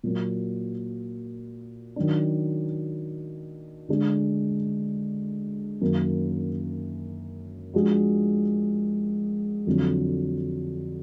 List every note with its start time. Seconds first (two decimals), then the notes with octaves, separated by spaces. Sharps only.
0.03 A#2 F#3 A#3
1.96 D#3 F#3 D4
3.89 D3 G#3 D4
5.81 F#2 D#3 A#3
7.74 F3 G#3 D4 F#4
9.67 F2 D3 F#3